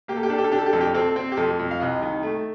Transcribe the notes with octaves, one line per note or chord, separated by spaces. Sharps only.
A#3 G4
A4
G4
D4 A4
G4
A4
D4 G4
A4
G4
F2 A4
G4
C4 A4
C4
G4
F2 A4
F2
F5
C2 D#5
D#3
A3